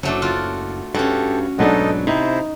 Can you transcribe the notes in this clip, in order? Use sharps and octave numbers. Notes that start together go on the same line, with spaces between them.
F#1 F#3 A3 D4
F4 F#4 D5
G2 C#4 F#4 G4 A4
B1 G#2 F#3 B3 D4 D#4 A4 D#5
C3 D#4 E4 C5